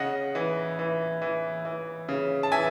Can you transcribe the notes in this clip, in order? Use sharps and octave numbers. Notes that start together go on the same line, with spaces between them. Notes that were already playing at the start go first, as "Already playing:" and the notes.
Already playing: C#3 D#5 F#5
E3
E3
E3
E3
C#3
A5
E3 E5 G#5